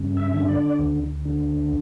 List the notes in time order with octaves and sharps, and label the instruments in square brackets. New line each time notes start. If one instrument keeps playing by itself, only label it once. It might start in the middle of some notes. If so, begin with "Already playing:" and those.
Already playing: [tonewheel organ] G2 C#3
E5
D3
D5
D2
D3